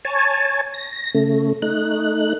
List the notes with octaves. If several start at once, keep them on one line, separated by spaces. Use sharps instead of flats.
C#5 G#5 A5
A#6
C#3 A3
A3 D#4 F#6